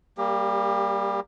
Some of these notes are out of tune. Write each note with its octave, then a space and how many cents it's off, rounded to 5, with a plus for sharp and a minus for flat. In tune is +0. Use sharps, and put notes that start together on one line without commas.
G3 +0 A#3 +0 G4 +35